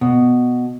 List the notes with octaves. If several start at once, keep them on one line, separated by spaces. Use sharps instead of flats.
B2